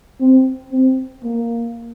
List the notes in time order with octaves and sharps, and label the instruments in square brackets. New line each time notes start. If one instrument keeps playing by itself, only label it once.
[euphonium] C4
C4
A#3